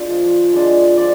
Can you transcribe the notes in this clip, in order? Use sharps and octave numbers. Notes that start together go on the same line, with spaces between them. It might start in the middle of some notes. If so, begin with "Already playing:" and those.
Already playing: G#3 D4 F4
F3
G#3 D4 F4
F3 D5